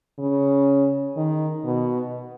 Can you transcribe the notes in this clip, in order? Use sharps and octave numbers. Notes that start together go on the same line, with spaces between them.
C#3
D#3
B2